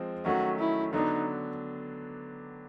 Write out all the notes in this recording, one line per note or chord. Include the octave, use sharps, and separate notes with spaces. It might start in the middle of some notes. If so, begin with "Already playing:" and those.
Already playing: F3 G#3 C4
D#3 F#3 A3 C#4 F#4
E4
D3 F#3 B3 D4 D#4